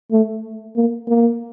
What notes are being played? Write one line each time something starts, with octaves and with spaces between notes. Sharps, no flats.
A3
A#3
A#3